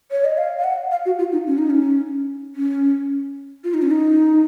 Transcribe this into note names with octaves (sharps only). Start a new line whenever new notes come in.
C#5
D#5
F5
F5
F#5
F5
F#4
F4
D#4
C#4
D#4
C#4
C#4
F4
D#4
C#4
D#4